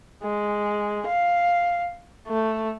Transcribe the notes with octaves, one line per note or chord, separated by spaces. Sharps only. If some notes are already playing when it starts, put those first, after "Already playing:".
G#3
F5
A3